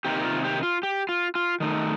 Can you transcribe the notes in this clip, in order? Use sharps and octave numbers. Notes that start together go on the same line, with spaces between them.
C3 D#3 A#3 D#4 G4
F4
G4
F4
G4
F4
F4
D#3 A3 D#4